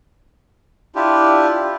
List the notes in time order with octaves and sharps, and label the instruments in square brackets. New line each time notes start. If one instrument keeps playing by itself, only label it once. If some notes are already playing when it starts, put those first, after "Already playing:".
[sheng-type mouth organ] D4 E4 F4 G4